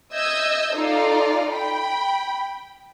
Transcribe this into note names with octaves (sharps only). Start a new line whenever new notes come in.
D#5 E5 E6 G6 G#6
D#4 F4 A4 D5 F5
G5 B5